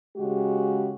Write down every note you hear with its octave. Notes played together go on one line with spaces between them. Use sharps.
C#3 G#3 F#4 G4